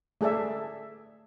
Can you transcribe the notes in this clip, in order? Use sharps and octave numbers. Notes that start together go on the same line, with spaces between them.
A3 G#4 A4 D5 E5